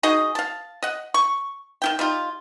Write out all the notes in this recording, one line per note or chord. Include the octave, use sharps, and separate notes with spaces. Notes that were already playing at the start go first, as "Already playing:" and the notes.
D#4 F#4 G#4 D#5
F5 A5
D#5 F#5
C#6
D#3 E4 G5
G3 D#4 F4